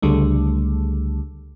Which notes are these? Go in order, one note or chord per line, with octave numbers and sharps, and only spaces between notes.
C#2 D3 G3 A3